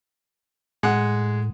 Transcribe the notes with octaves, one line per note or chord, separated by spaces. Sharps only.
A2 G#3 F#5